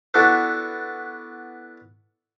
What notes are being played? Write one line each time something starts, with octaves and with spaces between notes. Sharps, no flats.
B3 D4 E4 F#4 A4 B4